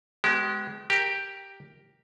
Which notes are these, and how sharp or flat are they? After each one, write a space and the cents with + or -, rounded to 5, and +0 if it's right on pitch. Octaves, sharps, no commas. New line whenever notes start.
G#3 +10 B3 +30 G4 -35
G4 +0 A#4 +0